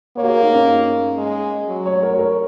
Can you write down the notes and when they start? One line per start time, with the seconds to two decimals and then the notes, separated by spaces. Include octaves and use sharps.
0.16 A#3 C#5
0.23 F#4
0.29 G#4
0.41 D#4
0.54 C#4
1.18 G#3
1.68 F#3
1.86 C#5
2.03 A#4
2.13 C#5
2.19 A#4